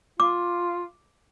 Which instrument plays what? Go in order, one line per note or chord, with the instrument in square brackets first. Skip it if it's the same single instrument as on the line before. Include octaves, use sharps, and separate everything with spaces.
[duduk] F4 [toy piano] D6